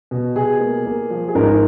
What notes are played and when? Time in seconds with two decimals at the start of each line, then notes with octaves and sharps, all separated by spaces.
0.11 B2
0.36 B2 G#4
0.60 A#3
0.86 A#3
1.10 F3
1.28 G#4
1.35 G#2 A#4